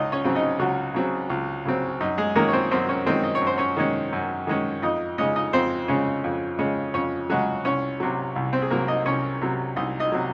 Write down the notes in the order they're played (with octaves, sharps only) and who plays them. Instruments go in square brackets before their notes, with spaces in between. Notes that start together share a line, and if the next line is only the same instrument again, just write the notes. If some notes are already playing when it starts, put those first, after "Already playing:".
Already playing: [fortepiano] C#2 C#3 D#4 D#5
C#4 C#5
C#3 F#3 C4
D#4 D#5
C#2 F#3 F#4
C#3 F#3 C4
C#2
C#3 F#3 C4
F#2 D#4
G#3 G#4
D#3 G#3 A#3 C#4 A#4
C#5
C4 C5
F#2 C4 C5
C#4 C#5
D#3 G#3 C4 C#4 C5
D#5
C#5
F#2
C5
C#4 C#5
D#3 G#3 C#4
F#2
D#3 G#3 C#4
F2 D#4 D#5
C#3 G#3 C#4 D#4 D#5
D#4 D#5
F2 C4 C5
C#3 G#3 C#4
F2
C#3 G#3 C#4
F2 C#4 C#5
C#3 F#3 G#3 C#4 F#4
C2 C#4 C#5
C3 F#3
C2
C4 C5
G#4
C3 F#3 A#3 A#4
D#4 D#5
C2 C#4 C#5
C3 F#3
C2 D#4 D#5
D#4 D#5
C3 F#3